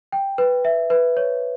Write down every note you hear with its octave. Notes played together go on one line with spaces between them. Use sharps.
G5
B4
E5
B4
C#5